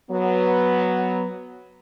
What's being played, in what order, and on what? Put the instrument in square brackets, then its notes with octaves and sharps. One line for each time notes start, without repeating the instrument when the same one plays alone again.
[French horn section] F#3 B3